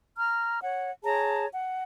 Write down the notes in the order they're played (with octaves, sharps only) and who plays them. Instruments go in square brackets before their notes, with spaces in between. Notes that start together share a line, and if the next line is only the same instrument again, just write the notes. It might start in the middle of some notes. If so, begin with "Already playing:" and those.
[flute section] A#5 F6
C#5 F#5
G#4 C#5 A5 A#5
F#5